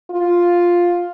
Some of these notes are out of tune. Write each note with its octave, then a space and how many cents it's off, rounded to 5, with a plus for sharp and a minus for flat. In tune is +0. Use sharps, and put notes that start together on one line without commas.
F4 +5